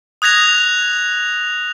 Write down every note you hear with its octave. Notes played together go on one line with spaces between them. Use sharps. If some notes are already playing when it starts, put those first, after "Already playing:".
D#6 F#6 G#6 A#6 F7